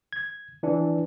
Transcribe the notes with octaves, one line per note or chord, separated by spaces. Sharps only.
G#6
E3 D4